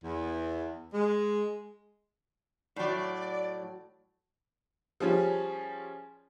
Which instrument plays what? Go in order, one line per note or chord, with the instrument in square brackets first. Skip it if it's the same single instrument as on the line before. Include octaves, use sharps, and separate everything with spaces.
[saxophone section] E2
G#3
[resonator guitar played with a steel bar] A2 F#3 [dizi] D5
[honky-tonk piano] F3 G3 C#4 G#4